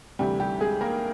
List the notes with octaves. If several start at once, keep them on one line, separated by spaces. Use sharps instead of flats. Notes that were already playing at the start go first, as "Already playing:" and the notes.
D2 C3 E3 G3 G4
G3 G4
G#3 G#4
A#3 A#4